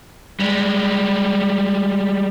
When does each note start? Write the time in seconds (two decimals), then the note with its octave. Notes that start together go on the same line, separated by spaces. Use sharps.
0.40 G3 G#3